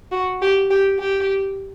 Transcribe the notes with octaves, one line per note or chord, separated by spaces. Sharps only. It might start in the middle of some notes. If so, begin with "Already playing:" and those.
F#4
G4
G4
G4